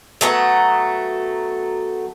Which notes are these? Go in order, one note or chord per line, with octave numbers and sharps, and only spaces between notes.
F#3 A3 B3